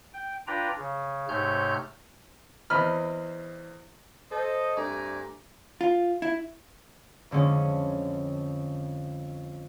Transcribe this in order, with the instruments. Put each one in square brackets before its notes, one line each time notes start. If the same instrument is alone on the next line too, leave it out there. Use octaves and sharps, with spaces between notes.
[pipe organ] G5
D4 F4 B4 D5 G5 A#5
C#3
G#2 C3 A3 C#5 F6 G6
[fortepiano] E2 C4 D#5 B5 F6
[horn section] A4 C5 D#5
G2 A3 C4 D5 G#5 A#5
[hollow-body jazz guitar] F4
E4
[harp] F2 D3 G#3 C#4